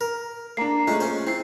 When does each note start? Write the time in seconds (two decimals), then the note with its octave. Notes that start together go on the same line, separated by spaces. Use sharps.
0.01 A#4
0.57 A#3 D4 A#5 C7
0.87 G#3 A3 C#4 F4 G#4
1.00 C#4 C5
1.27 C4 E4 C7